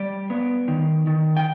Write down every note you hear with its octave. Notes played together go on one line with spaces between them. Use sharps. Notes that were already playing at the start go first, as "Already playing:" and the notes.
Already playing: G3 D5
B3
D#3
D#3
G5